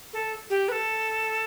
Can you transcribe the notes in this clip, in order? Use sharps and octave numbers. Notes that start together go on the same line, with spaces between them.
A4
G4
B4
A4